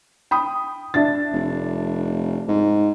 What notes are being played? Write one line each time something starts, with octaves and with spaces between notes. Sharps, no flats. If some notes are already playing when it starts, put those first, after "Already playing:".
G5 B5 D#6
D4 E5 A6
F1
G#2